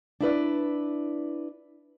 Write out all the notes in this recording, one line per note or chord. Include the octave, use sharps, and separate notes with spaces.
D4 E4 B4 D5